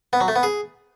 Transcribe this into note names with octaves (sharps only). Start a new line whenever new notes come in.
B3
F#3
A3
B3
G#4